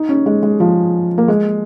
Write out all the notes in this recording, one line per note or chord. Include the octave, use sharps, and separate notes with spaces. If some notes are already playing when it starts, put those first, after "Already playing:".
Already playing: D#4
C#4
G#3
G#3
F3
A#3
G#3